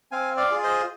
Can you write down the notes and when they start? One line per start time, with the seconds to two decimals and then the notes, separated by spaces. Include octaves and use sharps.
0.11 C4 F5 G#5
0.37 D5 F5
0.51 F4 G#4
0.63 C5 D#5